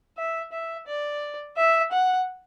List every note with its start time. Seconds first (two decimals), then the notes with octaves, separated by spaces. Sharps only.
0.17 E5
0.52 E5
0.88 D5
1.57 E5
1.92 F#5